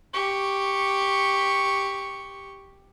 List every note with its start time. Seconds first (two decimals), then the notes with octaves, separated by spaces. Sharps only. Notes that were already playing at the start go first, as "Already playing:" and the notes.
0.13 G4 C#6